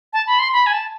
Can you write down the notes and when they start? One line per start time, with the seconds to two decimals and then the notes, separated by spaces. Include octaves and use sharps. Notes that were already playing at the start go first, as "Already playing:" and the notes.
0.13 A5
0.27 B5
0.39 C6
0.53 B5
0.66 G#5
0.73 A5